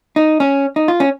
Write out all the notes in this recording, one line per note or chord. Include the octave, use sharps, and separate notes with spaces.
D#4
C#4
D#4
F4
C#4